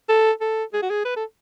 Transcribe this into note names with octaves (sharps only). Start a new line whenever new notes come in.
A4
A4
G#4
F#4
G#4
B4
A4